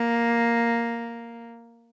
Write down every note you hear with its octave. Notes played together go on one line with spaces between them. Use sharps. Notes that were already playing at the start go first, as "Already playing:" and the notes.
Already playing: A#3